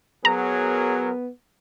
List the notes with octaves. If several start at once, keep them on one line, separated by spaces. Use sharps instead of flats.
F#3 B3 G#4 A#4 A#5